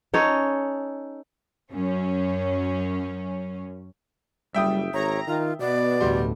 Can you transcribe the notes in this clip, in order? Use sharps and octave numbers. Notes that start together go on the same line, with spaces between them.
C#4 D#4 A4 C#5
F#2 C#4
F#1 G3 E5 G5 D#6
G#1 C#5 A#5
D#3 F4
B2 B3 D5
D2 A2 G3 F#4 C6